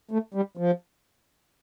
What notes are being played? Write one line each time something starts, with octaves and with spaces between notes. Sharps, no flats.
A3
G3
F3